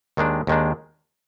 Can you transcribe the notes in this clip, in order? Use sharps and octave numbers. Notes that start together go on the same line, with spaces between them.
D#2 D#3 G#3 D4
D#2 D#3 G#3 D4